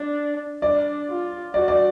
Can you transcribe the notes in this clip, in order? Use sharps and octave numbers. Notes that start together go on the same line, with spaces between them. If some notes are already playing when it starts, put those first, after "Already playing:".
Already playing: D4
D4 D5
F4
F#4 D5
D5